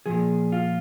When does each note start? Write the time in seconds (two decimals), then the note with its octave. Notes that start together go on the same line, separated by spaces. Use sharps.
0.06 A#2 F3 G#4
0.52 F4